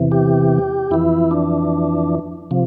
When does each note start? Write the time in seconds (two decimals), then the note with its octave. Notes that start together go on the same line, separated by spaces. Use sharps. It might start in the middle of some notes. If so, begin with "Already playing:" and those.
Already playing: E2 C3 E3
0.12 G4
0.91 F2 E3 E4
1.31 D4
2.51 C3 F3